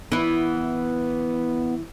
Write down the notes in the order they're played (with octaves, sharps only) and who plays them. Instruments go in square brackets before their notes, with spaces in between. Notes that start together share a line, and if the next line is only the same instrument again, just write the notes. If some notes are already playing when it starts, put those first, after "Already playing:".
[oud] E3 E4 [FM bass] B3